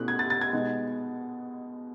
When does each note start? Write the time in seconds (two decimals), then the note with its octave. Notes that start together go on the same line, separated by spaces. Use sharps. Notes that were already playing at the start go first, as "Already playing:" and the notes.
Already playing: B2 A3 C#4 E4 F#6
0.08 G#6
0.19 A6
0.30 A6
0.41 G#6
0.53 B2 G#3 D#4